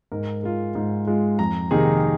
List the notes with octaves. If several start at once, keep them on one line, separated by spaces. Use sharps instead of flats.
G#2 A#4
G#3 F4
G#2
G#3 F4
F2 A#5
C3 D#3 A#3 D#4 G#4